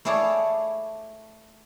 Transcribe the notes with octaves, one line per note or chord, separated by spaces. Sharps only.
A3 E4 G#4 C#5 D5 F5